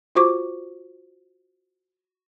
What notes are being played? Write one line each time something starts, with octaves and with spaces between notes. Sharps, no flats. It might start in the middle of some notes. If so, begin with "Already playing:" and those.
F4 F#4 C5 C#6 D6